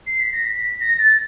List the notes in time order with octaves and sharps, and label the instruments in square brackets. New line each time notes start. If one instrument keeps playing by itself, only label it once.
[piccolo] C7
B6
A#6
B6
A#6
A6